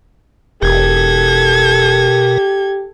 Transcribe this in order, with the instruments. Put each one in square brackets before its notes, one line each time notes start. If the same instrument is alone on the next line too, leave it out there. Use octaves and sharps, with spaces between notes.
[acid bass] E1 [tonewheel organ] B2 A#4 [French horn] G4 [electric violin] A4 G#6